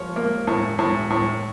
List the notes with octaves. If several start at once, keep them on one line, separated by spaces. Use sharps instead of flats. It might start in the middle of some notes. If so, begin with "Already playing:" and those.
Already playing: F3 C#5
A#3
A2
A2
A2